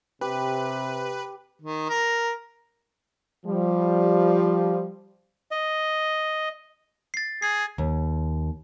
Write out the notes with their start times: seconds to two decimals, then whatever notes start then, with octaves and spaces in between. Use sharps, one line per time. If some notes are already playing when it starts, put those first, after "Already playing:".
0.21 C3 G4 B4
1.62 D#3
1.89 A#4
3.46 F3 G3
5.51 D#5
7.14 A6 C7
7.42 G#4 C7
7.78 D#2